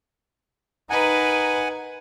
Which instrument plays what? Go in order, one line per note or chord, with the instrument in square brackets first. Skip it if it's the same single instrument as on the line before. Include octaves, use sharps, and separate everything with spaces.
[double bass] D#4 [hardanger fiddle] A#4 B4 [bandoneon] F#5 G#5